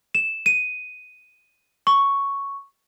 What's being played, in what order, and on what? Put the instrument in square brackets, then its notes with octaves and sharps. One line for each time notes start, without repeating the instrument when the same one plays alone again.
[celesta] E7
D#7
C#6